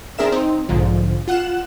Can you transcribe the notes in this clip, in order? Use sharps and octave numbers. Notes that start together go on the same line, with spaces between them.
C4 D4 G#4 A#4 E5 E7
C4 D#4
B1 G#2 D3 F3
F4 F#5 F#6 E7